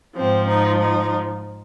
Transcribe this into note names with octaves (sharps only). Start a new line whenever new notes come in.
G#2 F3 C4
D#4
D#4